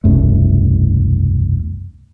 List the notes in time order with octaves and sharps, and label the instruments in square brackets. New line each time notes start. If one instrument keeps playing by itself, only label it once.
[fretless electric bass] E1 C2 F#2 A3